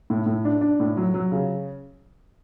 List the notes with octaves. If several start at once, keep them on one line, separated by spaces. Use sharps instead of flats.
A2
A2
D4
D4
A2
F#3
F#3
C#3